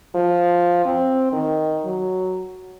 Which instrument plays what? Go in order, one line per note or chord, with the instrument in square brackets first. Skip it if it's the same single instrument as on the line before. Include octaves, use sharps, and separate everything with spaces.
[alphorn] F3
C4
D#3
F#3